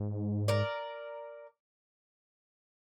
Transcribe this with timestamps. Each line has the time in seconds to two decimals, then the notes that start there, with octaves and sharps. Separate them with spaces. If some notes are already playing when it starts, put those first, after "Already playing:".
Already playing: G#2
0.48 A#4 D5